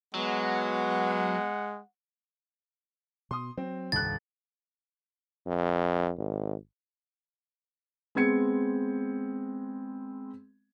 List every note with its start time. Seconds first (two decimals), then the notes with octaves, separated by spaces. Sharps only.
0.15 F#3 G#3 B3 F#5
3.31 B2 C6 D#6
3.57 F#3 C4
3.92 D#1 C2 G2 F#6 A6
5.47 F2
6.18 G#1
8.15 G#3 B3 C4 G#6 C#7